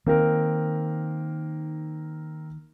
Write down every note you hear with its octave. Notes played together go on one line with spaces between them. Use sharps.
D#3 A#3 C4 A#4